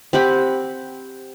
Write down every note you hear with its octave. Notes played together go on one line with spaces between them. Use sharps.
C4 G4 F#5 B5